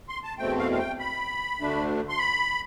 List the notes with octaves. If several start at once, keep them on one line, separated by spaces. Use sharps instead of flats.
C6
A5
E2 B2 A3 C4 G5
F5
F5
G5
B5
D2 D3 A3 D4
C6
B5